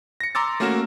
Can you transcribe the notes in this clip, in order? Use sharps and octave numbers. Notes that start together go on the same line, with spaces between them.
A#6 C#7
A#5 C6 D6 E6 A6
A3 A#3 C#4 F#4 A#4 E7